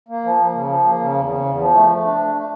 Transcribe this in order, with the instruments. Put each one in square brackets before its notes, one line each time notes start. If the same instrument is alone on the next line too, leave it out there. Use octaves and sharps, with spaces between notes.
[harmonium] A#3
F3
A#3
C#3
F3
A#3
C#3
E2
C#3
E2
F3
A3
A3
D4
A3
A3